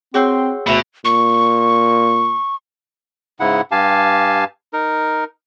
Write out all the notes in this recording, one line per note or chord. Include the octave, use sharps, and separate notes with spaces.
C4 F#4 G#4 C#5 G5 C6 E6
D2 B2 B4 E5 G5
A#2 C#6
G#2 C#3 E4 F#5
G2 G4 F5 G#5 A5
D#4 A#4